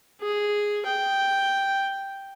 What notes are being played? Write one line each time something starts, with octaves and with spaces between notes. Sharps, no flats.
G#4
G5